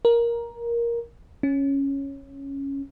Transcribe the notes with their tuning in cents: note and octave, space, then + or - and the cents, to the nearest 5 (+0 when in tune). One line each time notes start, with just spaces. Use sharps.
A#4 +10
C#4 -5